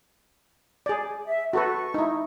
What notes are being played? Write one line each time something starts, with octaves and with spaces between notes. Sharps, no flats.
G#4 D5
E5
F#4 A4 B4 C#6
D#4 E4